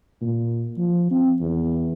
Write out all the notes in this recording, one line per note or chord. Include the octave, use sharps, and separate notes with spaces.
A#2
F3
C4
E2